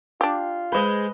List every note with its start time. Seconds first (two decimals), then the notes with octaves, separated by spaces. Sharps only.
0.21 D4 F4 G4
0.72 G#3 B4 C5 D#5